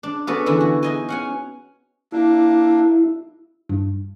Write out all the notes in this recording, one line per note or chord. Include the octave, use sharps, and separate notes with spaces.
D4
B3 C#4 D4 F#4 A4 B4
D3 E3 E4
F#4
D#4 D#5 G#5
C#4 F#5 G#5
A#3 D4 E4
G2